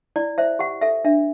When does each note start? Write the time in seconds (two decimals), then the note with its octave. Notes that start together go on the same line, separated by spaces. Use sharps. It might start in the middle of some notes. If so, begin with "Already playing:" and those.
0.16 E4 D5
0.38 C5 E5
0.59 G4 F#5
0.81 A4 E5
1.05 D4 E5